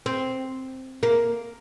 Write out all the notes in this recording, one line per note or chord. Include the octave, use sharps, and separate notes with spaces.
C4
A#3